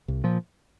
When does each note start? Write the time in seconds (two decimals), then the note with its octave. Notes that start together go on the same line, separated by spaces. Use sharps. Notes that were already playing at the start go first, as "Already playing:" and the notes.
0.08 C2
0.24 A#2 F3